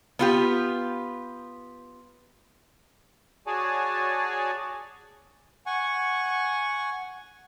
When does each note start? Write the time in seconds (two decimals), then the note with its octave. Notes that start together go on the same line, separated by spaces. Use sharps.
0.19 B3 F4 G4
3.47 F#4 G#4 C#5 D5 G#5 A5
5.66 F#5 G#5 C#6